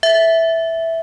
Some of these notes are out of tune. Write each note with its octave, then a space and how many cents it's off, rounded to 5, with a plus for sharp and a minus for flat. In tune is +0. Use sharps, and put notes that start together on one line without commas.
E5 -5